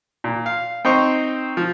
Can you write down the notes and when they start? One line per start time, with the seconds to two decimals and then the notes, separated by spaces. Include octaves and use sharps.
0.24 A#2
0.46 F5
0.85 C4 D#4 C5 C#6
1.57 F3